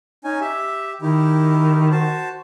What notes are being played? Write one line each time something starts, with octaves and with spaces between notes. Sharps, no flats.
C#4 D#4 G#5
G4 E5
D#3 D#4 E4 G4
F#4 C5 A5